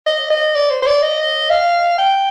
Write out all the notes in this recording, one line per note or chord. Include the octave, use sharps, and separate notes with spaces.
D#5
D#5
D5
C5
C5
D5
D#5
F5
G5